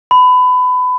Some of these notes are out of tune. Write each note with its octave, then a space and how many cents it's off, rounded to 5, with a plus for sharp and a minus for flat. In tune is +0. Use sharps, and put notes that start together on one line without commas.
B5 +25